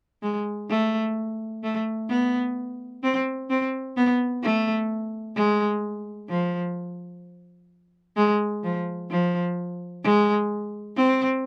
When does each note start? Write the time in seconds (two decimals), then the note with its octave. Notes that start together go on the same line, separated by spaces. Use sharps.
0.23 G#3
0.70 A3
1.63 A3
2.09 B3
3.03 C4
3.50 C4
3.97 B3
4.43 A3
5.36 G#3
6.30 F3
8.17 G#3
8.64 F3
9.10 F3
10.04 G#3
10.97 C4